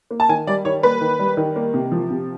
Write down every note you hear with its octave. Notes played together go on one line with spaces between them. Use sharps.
A#3
A5
D#3 G#5
G3 D5
D#3 C#5
A#3 B4
D#3
G3
D#3
A#3
C3
F3
C3